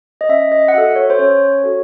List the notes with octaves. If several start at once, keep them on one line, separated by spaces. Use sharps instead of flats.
D#5
C#4 E5
D#5
F#5
F#4 A4 E5
C#5
C5
C#4 C#5
F#4 A4